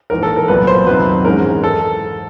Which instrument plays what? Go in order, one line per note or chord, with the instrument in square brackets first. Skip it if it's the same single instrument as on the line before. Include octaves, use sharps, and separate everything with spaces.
[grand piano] A#1 G#2 E3 A#4
A4
A#4
C2 A#2 F#3 B3 B4
C5
F2 C3 D#3 F#3 B4
G#2 E3 G#3 C#4 A#4
A4